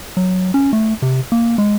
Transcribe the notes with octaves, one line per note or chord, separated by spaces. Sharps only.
F#3
C#4
A3
C3
A#3
G#3